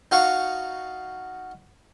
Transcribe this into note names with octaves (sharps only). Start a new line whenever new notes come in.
D#4 F#4 F5 F#5 A5 C#6